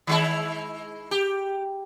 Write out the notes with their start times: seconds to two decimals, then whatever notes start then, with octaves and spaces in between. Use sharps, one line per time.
0.07 D#3 G#3 E4
1.11 G4